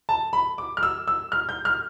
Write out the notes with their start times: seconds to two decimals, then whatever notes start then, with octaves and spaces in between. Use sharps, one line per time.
0.09 A5
0.33 B5
0.58 D6
0.77 F6
0.83 E6
1.08 E6
1.32 F6
1.49 G6
1.65 F6